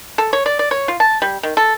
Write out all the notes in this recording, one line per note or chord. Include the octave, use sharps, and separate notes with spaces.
A4
C#5
D5
D5
C#5
F4
A5
G3
D#3
A4